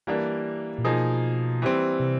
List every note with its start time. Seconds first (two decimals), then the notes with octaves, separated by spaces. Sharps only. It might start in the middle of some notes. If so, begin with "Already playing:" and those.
0.07 E3 G3 A#3 D4
0.78 A#2
0.84 B2 F3 A#3 D#4 G#4
1.62 E3 G3 C4
2.00 C3